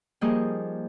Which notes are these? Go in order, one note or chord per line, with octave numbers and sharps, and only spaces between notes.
F3 G3 A#3 D#4 G#4 D#5